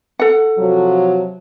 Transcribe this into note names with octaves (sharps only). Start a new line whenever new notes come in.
A4 F#5
C3 F3 F#3